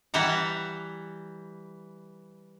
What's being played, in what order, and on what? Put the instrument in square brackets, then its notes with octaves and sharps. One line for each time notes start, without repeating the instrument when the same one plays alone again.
[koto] E3 G3 E5 F#5 A#5